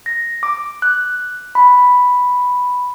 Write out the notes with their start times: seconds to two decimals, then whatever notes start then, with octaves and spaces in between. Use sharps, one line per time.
0.06 A#6
0.43 D6
0.82 F#6
1.55 B5